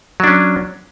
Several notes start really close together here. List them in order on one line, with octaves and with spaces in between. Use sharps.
F#3 D4 C#4